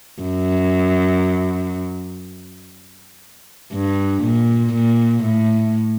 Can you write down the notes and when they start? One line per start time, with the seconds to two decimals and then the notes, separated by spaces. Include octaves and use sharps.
0.23 F#2
3.74 G2
4.24 A#2
4.74 A#2
5.24 A2